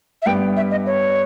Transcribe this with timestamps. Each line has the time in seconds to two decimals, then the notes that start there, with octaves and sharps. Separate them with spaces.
0.22 E5
0.26 G2 G3 B3 G5
0.56 E5
0.71 D#5
0.86 C#5